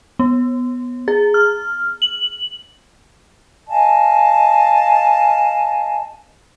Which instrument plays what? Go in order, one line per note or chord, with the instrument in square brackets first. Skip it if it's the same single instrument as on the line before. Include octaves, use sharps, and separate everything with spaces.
[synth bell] B3
G#4
F6
F#7
[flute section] D#5 F5 G#5 A5